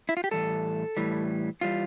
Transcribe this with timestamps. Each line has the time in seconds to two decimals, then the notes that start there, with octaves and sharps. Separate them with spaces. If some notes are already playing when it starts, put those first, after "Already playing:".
0.09 E4
0.17 F4
0.24 G4
0.31 A2 E3 G3 A4
0.97 A2 E3 G3
1.61 E3 G3 F4